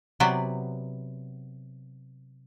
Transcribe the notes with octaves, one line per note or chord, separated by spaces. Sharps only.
C3 F#3 B3 B4 D5